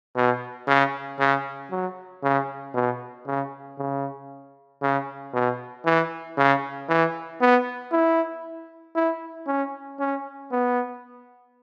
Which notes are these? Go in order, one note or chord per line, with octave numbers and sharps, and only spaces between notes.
B2
C#3
C#3
F#3
C#3
B2
C#3
C#3
C#3
B2
E3
C#3
E3
B3
E4
E4
C#4
C#4
B3